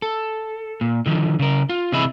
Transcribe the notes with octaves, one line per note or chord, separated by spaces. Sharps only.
A4
A#2
D3 D#3 F3
C#3 A#4
F4
C3 E3 G#4 D#5 E5 B5